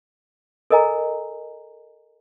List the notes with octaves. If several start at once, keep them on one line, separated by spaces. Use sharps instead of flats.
A4 A#4 D#5 G#5 A#5